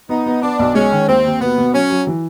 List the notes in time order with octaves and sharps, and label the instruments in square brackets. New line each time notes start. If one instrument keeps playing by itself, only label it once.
[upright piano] B3 [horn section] D#4
[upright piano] B3
[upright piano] B3 [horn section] D4
[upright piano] B1
[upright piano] G#3 [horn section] C#4
[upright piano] D#3
[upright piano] D#2 [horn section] C4
[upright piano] D#2
[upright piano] B2 [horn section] B3
[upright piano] B2
[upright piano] F#3 [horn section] C#4
[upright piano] F#3
E3